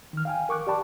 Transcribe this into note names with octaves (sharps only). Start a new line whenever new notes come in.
D#3 F6
F5 G5 G#5
A#4 C#6 D6 F#6
G4 D5 G5 A5 B5